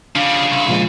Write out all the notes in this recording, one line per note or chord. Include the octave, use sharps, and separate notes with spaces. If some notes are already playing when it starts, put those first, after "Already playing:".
C#3 F3 G3 D4 F5
C2
A#2 F3 G#3